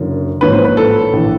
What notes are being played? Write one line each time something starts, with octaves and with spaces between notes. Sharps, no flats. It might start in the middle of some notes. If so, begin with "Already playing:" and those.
Already playing: F#1 F#2 D3
A1 G#2 F3 A#3 C#4 B4
C5
B4
A4
A#1 E3